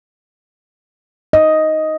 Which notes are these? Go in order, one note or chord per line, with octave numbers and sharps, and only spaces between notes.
D#5